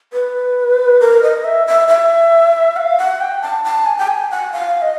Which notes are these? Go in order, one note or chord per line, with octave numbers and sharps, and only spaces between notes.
B4
A#4
D#5
E5
E5
E5
F#5
F5
F#5
G5
A5
A5
G#5
G5
G#5
F#5
F5
D#5